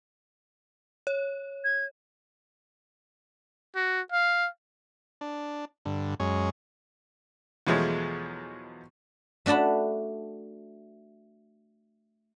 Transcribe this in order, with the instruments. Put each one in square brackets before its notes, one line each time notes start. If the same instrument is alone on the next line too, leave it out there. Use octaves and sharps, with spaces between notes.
[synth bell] C#5
[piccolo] G#6
[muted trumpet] F#4
F5
[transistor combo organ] D4
G2 D3
F#2 G#3 C#5
[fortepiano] E2 B2 F3 F#3 G#3 A3
[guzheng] A3 D4 F#4 A5 B5